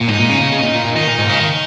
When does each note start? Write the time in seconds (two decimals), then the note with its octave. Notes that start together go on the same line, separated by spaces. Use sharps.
0.01 A#2
0.09 G#2 D#4
0.20 A#2
0.30 C#3
0.41 C#3
0.53 C#3
0.63 A#2
0.74 A#2
0.85 A#2
0.96 D#3 D#4
1.08 A#2
1.18 G#2
1.25 A#2
1.29 C#3
1.40 D#3